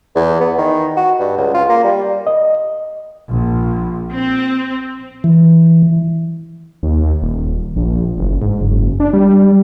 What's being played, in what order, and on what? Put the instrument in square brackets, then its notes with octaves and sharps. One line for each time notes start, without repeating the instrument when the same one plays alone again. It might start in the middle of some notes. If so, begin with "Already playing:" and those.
[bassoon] E2
B3
D#3
F#4
G2
C#2
F4
A#3
G3
[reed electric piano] D#5
[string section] A#1
C4
[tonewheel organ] E3
[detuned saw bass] D#2
D#1
A#1
F#1
G#2
F#1
D4
G3